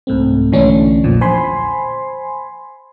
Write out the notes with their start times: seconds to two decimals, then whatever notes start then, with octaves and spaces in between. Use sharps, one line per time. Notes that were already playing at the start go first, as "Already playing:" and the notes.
0.07 C2 G#2 A3 C4
0.52 B1 D3 E3 A3 C#4 D4
1.04 A#1 E2 A#2 F3
1.21 C5 G#5 B5 C6